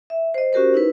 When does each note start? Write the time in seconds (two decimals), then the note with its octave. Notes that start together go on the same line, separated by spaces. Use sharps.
0.10 E5
0.34 C5 D#5
0.53 C#4 F#4 G4 A#4 C5
0.74 D#4 E4 B4